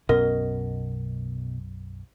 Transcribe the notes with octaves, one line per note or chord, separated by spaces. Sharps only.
B1 F#2 B2 C#4 A#4 D#5